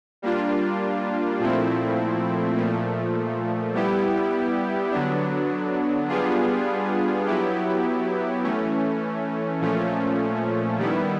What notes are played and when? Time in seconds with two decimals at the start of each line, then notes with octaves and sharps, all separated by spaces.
0.22 G3 A#3 D4 F4
1.39 A#2 F3 A3 C4 E4
2.56 A#2 F3 A3
3.74 G3 B3 E4 G4
4.91 D3 F#3 B3 D4
6.08 G3 B3 D4 F4 G#4
7.26 F#3 B3 E4 G4
8.43 E3 A3 C#4
9.61 A#2 F3 A3 C#4
10.78 D#3 G3 B3 E4